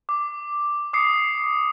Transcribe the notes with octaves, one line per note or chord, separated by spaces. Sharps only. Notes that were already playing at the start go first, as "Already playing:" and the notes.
D6
D6 D#6 C7 C#7